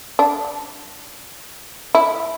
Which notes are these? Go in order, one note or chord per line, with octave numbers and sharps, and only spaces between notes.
D4
E4